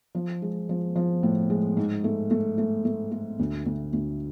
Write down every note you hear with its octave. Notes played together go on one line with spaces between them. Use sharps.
F3
G#3
F3
F3
A2
G#3
G#2
A3
A3
A3
A3
A3
D2
D2
D2